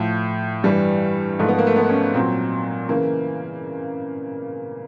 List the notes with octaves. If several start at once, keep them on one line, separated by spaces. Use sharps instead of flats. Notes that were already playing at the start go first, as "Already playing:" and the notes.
Already playing: A2 F3
G2 E3 G3
G#2 F3 A3
B3
A#3
A3
B3
C#4
A#2 F#3 C4
C#3 E3 A#3